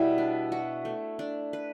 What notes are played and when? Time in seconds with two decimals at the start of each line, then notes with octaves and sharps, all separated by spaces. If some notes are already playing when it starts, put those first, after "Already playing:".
Already playing: B2 G3 E4 E5
0.18 D4
0.52 F#4
0.85 A3
1.19 D4
1.53 B4